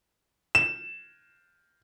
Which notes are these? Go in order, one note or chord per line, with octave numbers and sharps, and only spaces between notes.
E7